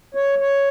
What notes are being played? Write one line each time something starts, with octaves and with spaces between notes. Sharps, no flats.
C#5
C#5